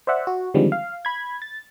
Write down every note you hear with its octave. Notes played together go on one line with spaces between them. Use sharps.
C5 D5 E5 F#5
F#4
D3 D#3 F3 G3 G#3 C4
F5
B5 G#6
A6